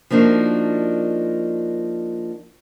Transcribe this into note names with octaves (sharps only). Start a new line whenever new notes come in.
F3 A#3 D4 D#4 F#4